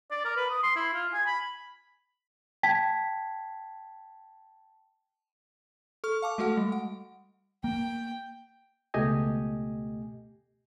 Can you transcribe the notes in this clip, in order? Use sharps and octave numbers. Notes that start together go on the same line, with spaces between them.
D5
A#4
B4
D#6
C6
E4
F4
G#5
B5
G5 A5 G#6 B6
A4 C#6 F6
F5 A5 D6
G#3 A3 F#4 A4 F#5
G3
F#5
A#3 G5
C#2 B2 A3 G4 D#5 G#5